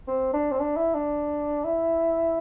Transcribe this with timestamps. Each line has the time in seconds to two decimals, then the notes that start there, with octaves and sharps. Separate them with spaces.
0.08 C4
0.34 D4
0.51 C4
0.60 D4
0.77 E4
0.94 D4
1.64 E4